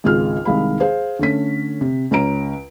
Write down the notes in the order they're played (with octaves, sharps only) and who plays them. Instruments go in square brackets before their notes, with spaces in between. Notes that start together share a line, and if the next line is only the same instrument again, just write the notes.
[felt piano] G#1 C#2 F4 G#4 F6
C2 D#3 G#3 F5 B5
G#4 C5 F5
D3 A3 C#4 B6
C3
C#2 C#4 A#5 D7